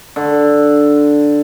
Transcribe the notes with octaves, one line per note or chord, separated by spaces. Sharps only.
D3